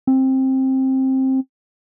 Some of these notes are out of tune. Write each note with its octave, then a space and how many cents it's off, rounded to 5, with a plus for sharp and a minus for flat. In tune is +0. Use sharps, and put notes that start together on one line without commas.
C4 +15